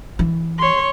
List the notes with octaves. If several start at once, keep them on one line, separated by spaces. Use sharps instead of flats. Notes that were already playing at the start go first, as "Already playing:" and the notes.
E3
C#5 C6